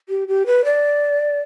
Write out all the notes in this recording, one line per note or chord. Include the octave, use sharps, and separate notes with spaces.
G4
G4
B4
D5